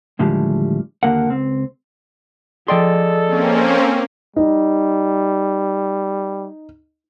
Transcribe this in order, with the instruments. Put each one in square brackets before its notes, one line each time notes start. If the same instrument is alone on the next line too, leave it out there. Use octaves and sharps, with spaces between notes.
[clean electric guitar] D#2 A2 D3 F3 G3 G#3
D#2 D3 A#3 A#4 F#5
C#2 C4
[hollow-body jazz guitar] F3 G5 C6 [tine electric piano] G#4 D5 D#5 [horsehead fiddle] A4
[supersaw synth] A#3 C4 C#4
[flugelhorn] G3 [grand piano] D#4